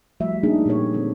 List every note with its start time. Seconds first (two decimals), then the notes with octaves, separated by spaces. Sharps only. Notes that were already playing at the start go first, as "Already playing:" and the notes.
0.20 F3 G3 A3 F#4 E5
0.43 A#3 D4 D#4 G#4
0.65 A#2 A#3 G4 A#4 C#5
0.93 D3 G#3 C4 A4